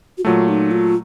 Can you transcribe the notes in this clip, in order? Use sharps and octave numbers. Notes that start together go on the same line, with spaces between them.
F#4
A#2 F#3 A3 F4
D#4
F4